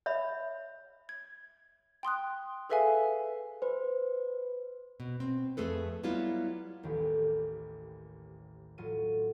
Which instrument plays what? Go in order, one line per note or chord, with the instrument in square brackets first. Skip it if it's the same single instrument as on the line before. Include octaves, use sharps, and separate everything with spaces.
[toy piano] C#5 E5 B5
[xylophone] G#6
G5 C6 D#6 F#6
G#4 A4 B4 E5 F5 G#5
[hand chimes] B4 C5
[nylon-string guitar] B2
C4
F2 A3 G#4 A4 B4
F#3 G3 B3 E4 F4
[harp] A1 D#2 A2 D#3 G4
A2 F#3 F4 D#7